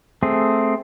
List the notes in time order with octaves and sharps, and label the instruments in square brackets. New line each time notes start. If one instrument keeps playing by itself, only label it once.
[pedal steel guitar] A3 C4 G#4